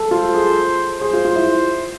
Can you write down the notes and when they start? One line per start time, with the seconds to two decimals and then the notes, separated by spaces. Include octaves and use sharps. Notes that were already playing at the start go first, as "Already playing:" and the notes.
Already playing: A4
0.11 F4 C5
0.34 G#4
1.01 G#4 C5
1.13 F4
1.25 F4
1.36 E4